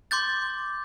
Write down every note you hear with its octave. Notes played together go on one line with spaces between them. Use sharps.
C6 D6 G6 A6